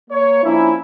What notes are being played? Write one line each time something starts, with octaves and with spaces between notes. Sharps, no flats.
A#3 C#5
F3 A#3 C#4 D4 E4